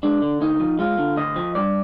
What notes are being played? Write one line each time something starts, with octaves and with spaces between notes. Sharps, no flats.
G#3 D4
D3
D2 D#4
F3
G#3 F4
D3
D2 D#5
F3
G2 D5